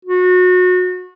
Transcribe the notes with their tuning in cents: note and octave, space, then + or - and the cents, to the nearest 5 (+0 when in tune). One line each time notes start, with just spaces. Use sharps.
F#4 -25